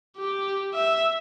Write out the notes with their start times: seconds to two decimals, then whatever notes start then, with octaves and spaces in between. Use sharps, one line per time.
0.18 G4
0.74 E5